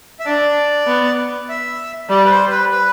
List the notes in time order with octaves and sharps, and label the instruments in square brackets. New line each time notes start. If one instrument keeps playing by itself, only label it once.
[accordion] E5
[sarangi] D4 [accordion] D5
[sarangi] B3
[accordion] E5
[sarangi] G3 [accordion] D5
[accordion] B4
C5
B4
B4